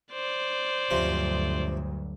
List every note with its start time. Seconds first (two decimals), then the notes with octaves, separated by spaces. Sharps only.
0.13 C5 D5
0.90 D2 G2 C3 F3 F#3 C#4